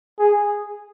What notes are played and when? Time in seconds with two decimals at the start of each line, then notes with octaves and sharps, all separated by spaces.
0.19 G#4